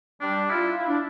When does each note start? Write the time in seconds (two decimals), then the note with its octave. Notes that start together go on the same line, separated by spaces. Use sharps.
0.21 G3 D4
0.50 E4 F4
0.78 E4
0.87 D4